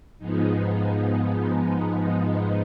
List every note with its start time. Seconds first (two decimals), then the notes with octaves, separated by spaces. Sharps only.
0.18 G#2 F3 G#3 B3 D#4
0.87 D#4